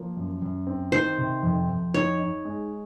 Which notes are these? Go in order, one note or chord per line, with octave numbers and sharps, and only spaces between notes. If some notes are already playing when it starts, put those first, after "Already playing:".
Already playing: F3 A#3
F#2
F#2
C4
D#3 C5
C3
F2
F2
D#4 C#5
D#4
G#3